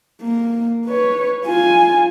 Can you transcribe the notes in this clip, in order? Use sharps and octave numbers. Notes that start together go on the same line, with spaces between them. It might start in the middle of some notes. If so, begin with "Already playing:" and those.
A#3
B4 C#5
F4 G#5